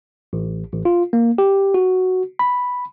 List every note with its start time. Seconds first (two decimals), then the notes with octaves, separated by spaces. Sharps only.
0.33 A1
0.73 A1
0.85 F4
1.13 A#3
1.38 G4
1.74 F#4
2.39 B5